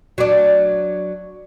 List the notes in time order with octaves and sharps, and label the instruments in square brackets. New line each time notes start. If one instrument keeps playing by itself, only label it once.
[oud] F#3 D4